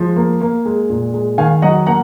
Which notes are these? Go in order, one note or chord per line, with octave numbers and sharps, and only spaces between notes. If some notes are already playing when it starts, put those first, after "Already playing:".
Already playing: F3 G#3
A#3
A#3
G#3
A#2
G#3
D#3 F5 G#5
F#3 D#5 F#5
A#3 F#5 A#5